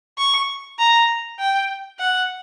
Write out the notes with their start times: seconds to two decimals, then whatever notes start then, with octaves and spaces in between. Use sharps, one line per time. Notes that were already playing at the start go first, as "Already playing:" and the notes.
0.18 C#6
0.78 A#5
1.39 G5
1.99 F#5